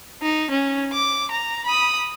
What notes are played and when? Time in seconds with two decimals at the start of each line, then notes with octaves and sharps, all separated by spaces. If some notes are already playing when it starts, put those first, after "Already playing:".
0.22 D#4
0.51 C#4
0.93 D6
1.31 A#5
1.65 B5 D#6